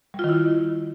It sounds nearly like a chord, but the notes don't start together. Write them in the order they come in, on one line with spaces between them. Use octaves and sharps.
G3 F4 D#3 E4